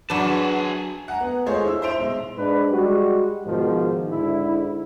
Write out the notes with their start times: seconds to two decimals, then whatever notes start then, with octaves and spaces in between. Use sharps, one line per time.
0.10 F#2 F#3 D4 G#4 B4 A5
1.08 F#5 G#5 A#5
1.21 B3
1.46 G#3 A3 F4 G#4 C5 C#5
1.66 E4 E6
1.82 C5 E5 C6 D7 F7
1.99 B1 G#3
2.37 G#2 D4 B4
2.71 G3 G#3 F#4
3.46 G#2 B2 D#3 F3
4.10 G#2 D3 E4